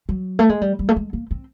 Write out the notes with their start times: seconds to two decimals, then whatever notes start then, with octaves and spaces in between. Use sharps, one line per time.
0.09 F#3
0.39 A3
0.49 G#3
0.61 G3
0.79 G3
0.89 A3
0.96 G#3
1.13 A#3
1.31 C4